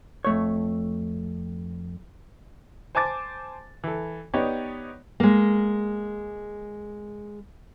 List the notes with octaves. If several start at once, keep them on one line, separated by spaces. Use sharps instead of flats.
F2 A3 C#5
C5 G#5 A5 D6 A6
E3 A4
B3 D#4 G4 C#5 D5
G#3 A#3